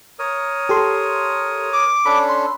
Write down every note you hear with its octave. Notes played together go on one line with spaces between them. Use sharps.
A#4 C#5 D#6
G4 A4 C6
D6
C#4 D4 A4 B5
C6